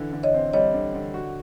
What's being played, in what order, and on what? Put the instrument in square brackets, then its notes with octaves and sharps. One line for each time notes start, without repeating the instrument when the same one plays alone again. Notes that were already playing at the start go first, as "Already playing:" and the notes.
Already playing: [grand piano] D3 E3
D3
[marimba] C#5 D#5
[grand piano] C4
[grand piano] G3 [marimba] C#5 D#5
[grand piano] D3
D3
F#4